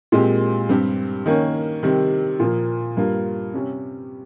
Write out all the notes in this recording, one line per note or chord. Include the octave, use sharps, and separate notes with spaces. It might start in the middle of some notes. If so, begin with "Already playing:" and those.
A#2 G#3 C4 G4
G2 G3 C4 G4
D#3 A#3 C#4
C3 D#3 G3 C4
A#2 F3 A#3
G2 G3 A#3 F4
C3 G3 C#4